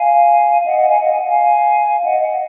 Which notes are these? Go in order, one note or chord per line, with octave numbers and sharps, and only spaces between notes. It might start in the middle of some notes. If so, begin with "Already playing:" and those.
Already playing: F5 G#5
D#5 F#5
D#5 F#5
F5 G#5
D#5 F#5
G#5
F#5
F5 G#5
D#5 F#5
D#5 F#5